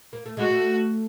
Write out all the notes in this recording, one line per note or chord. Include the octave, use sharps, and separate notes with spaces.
A#3
A3
G#3 F#4
A3